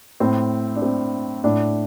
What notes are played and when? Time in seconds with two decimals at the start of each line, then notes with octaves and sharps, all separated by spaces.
0.20 A2 C4
0.76 D4
0.82 C4
1.44 A2 D4